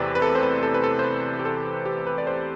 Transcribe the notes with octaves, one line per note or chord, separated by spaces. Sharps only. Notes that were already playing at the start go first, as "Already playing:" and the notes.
Already playing: E2 C3 E3 A3 C4 B4 D5
B4
A4
C5
B4
A4
B4
A4
C5
B4
G4
A4
G4
B4
D5
C5